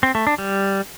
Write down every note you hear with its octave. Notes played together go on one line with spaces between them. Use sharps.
C4
A3
D4
G3